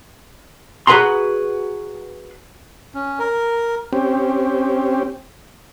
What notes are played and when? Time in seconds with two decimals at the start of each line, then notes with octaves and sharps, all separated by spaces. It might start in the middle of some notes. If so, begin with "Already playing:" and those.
0.87 F#4 G#4 B4 F#5 A#5 C6
2.94 C#4
3.19 A#4
3.93 C4 C#4 G4